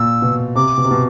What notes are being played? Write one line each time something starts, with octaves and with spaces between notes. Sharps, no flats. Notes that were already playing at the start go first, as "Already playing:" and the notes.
Already playing: A#2 E6
B2
C3 D6
B2
C3
B2